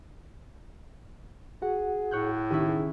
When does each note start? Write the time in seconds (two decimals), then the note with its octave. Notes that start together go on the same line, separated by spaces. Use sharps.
1.62 F#4 G#4 F#5
2.11 A2 C#5 F#6 G6
2.51 D#3 C#4 D#4 E4 G4
2.69 G#4